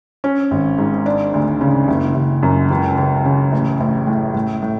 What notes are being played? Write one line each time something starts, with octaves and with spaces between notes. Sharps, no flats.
C#4
G#1
G#2
D4
D2
C#3
F#1
F#1
F#2
C#2
C#2
C#3
A1
A1
A2
A2
A2